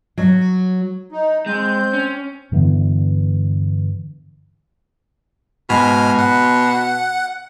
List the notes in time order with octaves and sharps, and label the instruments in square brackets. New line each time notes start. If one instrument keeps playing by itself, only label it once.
[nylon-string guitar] F#3
[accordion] D#4
[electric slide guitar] G#3 [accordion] C4 G6
[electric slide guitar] C#4
[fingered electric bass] G2 D3 E3 B3
[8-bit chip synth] G#2 G#5 F6 [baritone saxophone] B2
[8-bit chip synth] F#5